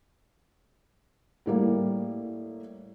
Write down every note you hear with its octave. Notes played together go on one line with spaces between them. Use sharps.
A2 G3 A#3